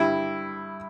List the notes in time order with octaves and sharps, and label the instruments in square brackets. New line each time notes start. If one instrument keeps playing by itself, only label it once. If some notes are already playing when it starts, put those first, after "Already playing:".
Already playing: [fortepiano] G2 D3 G3 E4